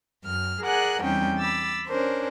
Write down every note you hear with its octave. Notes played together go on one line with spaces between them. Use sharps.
F#2 F6
G#4 A#4 D5 F#5 G#5 F#6
E2 G3 C4 C#4 D#4 G5
B5 D6 E6 A6
C#4 D4 A#4 C5